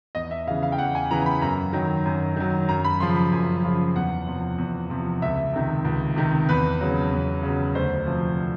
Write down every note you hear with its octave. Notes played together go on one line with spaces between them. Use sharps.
E2 D#5
E5
C#3 E3 F5
F5
G5
E2 F#5
G#5
C#3 E3 A#5
B5
F#2 A#5
D#3 F#3
F#2
D#3 F#3
F#2 A#5
B5
C#3 F3 C6
B5
F#2
C#3 F3
E2 F#5
C3 F3
E2
C3 F3
C#2 E5
C3 D#3
C#2
C3 D#3
E2 B4
C#3 F#3
E2
C#3
F#3
D2 C5
C3 F3